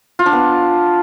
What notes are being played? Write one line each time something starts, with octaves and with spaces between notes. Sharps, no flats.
F4
D4
B3